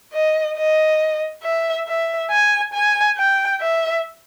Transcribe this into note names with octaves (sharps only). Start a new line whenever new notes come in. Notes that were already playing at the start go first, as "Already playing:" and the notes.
D#5
D#5
E5
E5
G#5
G#5
G5
E5